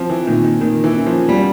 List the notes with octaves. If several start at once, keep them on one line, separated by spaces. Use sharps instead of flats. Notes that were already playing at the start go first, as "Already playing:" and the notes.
Already playing: F3 C4
E3
A#2 D#3
D#3
D#3 A#3
E3
C#4
F3
G3 B3